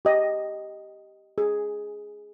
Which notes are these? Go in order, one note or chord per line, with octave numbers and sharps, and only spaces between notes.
G4 D#5
G#4